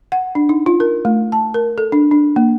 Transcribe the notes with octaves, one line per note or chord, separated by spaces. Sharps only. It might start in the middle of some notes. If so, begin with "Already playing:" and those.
F#5
D4
D#4
F4
A#4
A3
A5
A#4
A4
D4
D4
A#3